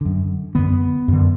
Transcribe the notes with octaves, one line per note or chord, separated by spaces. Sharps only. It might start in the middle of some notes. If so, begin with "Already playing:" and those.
F#2 D3
F#2 D3 B3
F#2 D3